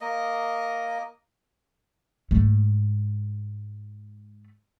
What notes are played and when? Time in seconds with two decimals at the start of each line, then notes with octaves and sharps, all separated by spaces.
0.01 A#3 D#5
2.31 G#2 A3